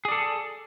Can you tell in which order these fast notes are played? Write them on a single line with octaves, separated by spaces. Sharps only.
G#4 D5 A4